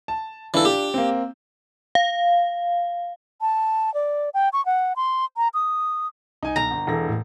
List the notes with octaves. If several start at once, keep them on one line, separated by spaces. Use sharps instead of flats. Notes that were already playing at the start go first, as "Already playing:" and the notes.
A5
E3 D4 F4 A4
G4
A#3 C4
F5
A5
D5
G5
C#6
F#5
C6
A#5
D#6
C2 D#4 G#5
B1 A#5
G1
E1 E3 D4 A4 A#6
A2